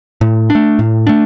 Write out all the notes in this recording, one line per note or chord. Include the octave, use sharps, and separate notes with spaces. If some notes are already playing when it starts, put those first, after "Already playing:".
A2
D4
A3
A2
A3 D4